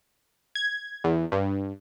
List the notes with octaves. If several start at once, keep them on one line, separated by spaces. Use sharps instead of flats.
G#6
E2
G2